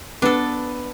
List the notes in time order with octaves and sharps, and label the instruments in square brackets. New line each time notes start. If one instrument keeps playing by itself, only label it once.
[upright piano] B3 B4 [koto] D4 A4